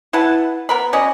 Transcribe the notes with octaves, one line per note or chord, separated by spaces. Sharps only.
E4 B4 F#5 A5
B3 A#4 B5
B2 C#4 D5 D#5